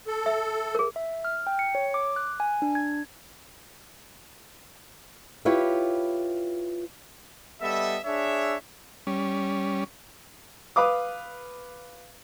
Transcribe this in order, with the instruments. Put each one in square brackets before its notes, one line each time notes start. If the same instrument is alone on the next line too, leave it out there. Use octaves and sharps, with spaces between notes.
[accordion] A4
[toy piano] E5
G#4 A#4
[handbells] E5
F6
G5
C#7
C#5
D6
F#6
G#5
D4
G#6
[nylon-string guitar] E4 F4 G4 B4 C#5
[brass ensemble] G3 B3 A4 D#5 E5
D4 G#4 C#5 E5
[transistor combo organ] G3 C#4
[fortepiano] B4 F5 D6 D#6